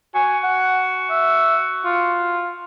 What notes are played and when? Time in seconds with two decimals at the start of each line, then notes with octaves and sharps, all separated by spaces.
0.15 F#4 G#5
0.44 F#5
1.10 E5
1.85 F4